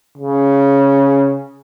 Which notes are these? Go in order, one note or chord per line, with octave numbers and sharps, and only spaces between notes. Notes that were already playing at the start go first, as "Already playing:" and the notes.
C#3